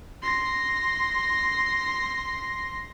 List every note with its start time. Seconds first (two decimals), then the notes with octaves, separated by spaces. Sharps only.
0.22 C6 A#6